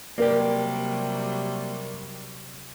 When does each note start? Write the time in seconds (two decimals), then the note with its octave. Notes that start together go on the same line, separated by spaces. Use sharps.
0.18 C3 F#3 G3 A#3 G4 A#4 D5